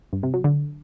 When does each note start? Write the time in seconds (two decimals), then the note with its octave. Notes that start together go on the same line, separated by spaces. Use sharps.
0.13 G2
0.23 C3
0.34 F#3
0.44 D3